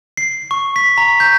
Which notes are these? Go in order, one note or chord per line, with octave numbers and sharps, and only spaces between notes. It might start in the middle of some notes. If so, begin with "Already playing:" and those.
C7
C#6
B6
A#5
G6